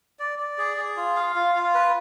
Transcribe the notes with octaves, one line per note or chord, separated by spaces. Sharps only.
D5
D5
G#4
G#4
F4
F5
F4
F4
B4